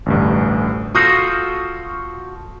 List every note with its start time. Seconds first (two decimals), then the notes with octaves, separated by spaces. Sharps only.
0.06 A1 D2 G2
0.95 F4 F#4 A4 C#6 D#6 G6